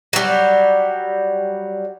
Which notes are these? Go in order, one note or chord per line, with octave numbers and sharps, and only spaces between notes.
F#3 G3